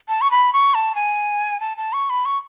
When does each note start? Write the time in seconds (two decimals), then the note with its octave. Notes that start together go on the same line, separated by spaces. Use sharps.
0.09 A5
0.21 C#6
0.31 B5
0.53 C#6
0.74 A5
0.95 G#5
1.60 A5
1.77 A5
1.93 C#6
2.10 B5
2.25 C#6